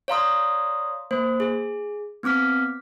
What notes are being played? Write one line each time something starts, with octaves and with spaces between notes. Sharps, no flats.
C#5 D5 F5 A#5 C6 D#6
A#3 C5
G#4
B3 C4 D6 F6 B6